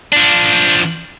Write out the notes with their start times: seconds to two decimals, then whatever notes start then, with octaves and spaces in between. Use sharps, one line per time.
0.13 F3 D4